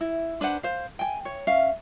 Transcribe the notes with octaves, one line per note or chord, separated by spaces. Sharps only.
E4
D4 B4 C5 F#5
C5 F5
G5 G#5
C#5
C#4 E5 F5